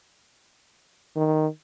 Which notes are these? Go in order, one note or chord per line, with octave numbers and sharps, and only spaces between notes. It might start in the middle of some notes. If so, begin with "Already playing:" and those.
D#3